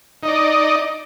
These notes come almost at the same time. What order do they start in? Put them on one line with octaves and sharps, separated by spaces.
D#4 D#5 D5